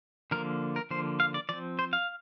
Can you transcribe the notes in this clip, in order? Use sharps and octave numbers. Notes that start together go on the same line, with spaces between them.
D3 F3 A#3 A#4
A#4
D3 F3 A#3 C5
F5
D5
F3 C4 D5
C5
F5